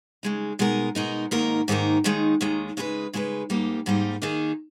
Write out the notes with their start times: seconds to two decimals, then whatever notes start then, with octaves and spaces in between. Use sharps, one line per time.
0.23 C#3 G#3 D#4
0.59 B2 G#3 D#4 A#4
0.95 B2 G#3 D#4 A#4
1.31 G#2 D#3 A#3 D#4 A#4
1.68 G#2 D#3 A#3 D#4 A#4
2.04 D#2 D#3 G#3 D#4
2.41 D#2 D#3 G#3 D#4
2.77 C#3 G#3 D#4 G#4 B4
3.13 C#3 G#3 D#4 G#4 B4
3.50 G#2 G3 A#3 D#4 G4
3.86 G#2 G3 A#3 D#4 G4
4.22 D#3 A#3 D#4 G#4